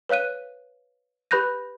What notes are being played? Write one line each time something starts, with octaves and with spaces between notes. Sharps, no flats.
B4 C#5 F5 F#6 D#7
G4 B4 B5 F#6 G6 A#6